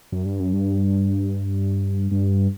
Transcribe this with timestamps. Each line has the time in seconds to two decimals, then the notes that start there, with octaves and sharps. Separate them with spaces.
0.12 F#2
0.25 G2
0.40 F#2
0.53 G2
2.11 G2